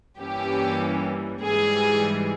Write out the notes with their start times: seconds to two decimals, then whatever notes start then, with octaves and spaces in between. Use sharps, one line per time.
0.19 G2 E3 G3 A#3 C#4 G4
1.43 G#2 E3 G3 G#4